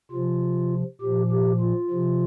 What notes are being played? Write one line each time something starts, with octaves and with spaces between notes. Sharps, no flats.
C3 F3 F4
A#2 F3 G4
G4
F4
C3 F3